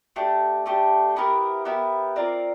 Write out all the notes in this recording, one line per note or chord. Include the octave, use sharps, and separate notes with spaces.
A3 D4 G4
A3 D4 G4
B3 E4 G4 A#4
B3 E4 G4 A#4
C4 F4 A#4 D5